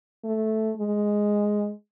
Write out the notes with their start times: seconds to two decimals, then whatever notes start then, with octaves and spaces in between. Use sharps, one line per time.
0.25 A3
0.77 G#3